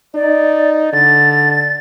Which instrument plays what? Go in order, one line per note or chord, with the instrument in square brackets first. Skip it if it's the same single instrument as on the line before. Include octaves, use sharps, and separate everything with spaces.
[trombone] D#4 [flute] D5
[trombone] D3 [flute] A6